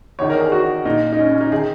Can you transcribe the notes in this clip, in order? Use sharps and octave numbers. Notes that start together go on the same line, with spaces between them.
E2 D#3 C#5
A#4
G#4
F#4
A#2 D#4
D#4
C#4
C#4
D#4
D#3 G#4